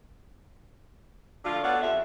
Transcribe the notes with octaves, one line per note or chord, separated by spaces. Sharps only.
D3 A3 D4 F4
B2 B3 D4 A4 C#5 F#5
F2 C3 E5